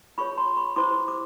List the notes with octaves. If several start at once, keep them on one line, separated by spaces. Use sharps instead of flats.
F4 G#4 C#5 B5 C#6
A#5 C6
B5 C#6
E4 G4 C5 C6 D6
D6